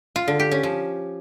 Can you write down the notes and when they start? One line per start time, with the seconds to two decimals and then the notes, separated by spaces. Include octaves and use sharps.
0.16 F4
0.28 D3
0.40 G4
0.51 C#4
0.63 F3